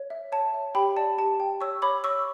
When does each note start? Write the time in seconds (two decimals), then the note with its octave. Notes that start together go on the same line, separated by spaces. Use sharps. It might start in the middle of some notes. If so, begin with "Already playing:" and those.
Already playing: C#5
0.10 E5
0.32 C#5 A5
0.54 E5
0.75 G4 G5 B5
0.97 D5 A5
1.18 G4 A5
1.40 G5
1.61 C#5 C#6 E6
1.82 C#5 B5 D6
2.04 C#5 C#6 E6